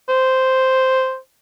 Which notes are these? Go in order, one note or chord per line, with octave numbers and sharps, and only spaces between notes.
C5